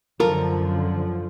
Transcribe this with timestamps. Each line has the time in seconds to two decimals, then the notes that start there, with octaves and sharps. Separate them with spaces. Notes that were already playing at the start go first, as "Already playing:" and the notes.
0.20 F#2 D3 F3 F4 A4 A#4